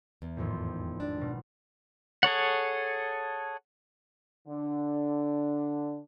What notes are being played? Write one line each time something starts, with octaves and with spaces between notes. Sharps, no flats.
E2
G#1 F2 A2
D4
B1 B2
G#4 A4 C#5 F#5
D3 D4